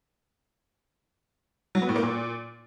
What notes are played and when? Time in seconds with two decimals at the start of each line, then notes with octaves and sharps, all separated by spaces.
1.75 F#3
1.82 B3
1.89 A2
1.96 A#3
2.03 A#2